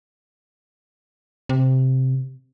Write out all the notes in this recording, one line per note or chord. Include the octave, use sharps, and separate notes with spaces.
C3